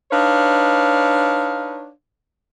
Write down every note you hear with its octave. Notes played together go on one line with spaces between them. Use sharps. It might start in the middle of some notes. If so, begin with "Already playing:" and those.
D4 D#4 B4 C#5 F5